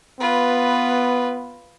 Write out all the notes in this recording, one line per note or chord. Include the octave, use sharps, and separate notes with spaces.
B3 F4 B4